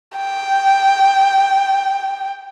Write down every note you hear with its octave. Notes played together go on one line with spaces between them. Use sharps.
G5